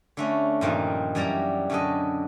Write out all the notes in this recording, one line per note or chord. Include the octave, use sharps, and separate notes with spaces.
D3 A3 C#4
G2 A#2 D#3 F3
F#2 E3 G3 D5 A#5
F#2 B2 D3 A4 D#5